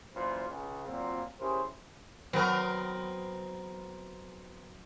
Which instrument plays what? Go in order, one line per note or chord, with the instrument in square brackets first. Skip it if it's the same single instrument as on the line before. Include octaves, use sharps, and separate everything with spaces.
[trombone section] F#2 A#2 E3 B4 C5
C#2 C#3
A#2 F#3 C4
C#4 E4 G4 G#4 A#4 C5
[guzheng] F#3 [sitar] B3 C4 A#4